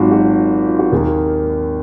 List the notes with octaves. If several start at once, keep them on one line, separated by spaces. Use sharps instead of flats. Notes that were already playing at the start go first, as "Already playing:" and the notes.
Already playing: G#1 G#2 F#3 F4 F#4
F#4
F4
F#4
D#2 D#3 A#3 G#4